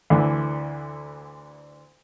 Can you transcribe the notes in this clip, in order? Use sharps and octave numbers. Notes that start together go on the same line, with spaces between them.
D2 D3 E3